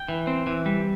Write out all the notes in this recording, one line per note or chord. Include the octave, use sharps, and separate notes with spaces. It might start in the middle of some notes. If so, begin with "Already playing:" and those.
Already playing: G5
E3
C4
E3
G3